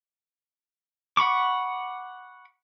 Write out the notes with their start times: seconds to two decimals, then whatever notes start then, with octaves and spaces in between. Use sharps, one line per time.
1.17 F#5 B5 C#6 D6